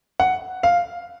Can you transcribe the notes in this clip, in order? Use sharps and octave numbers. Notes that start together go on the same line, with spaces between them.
F#5
F5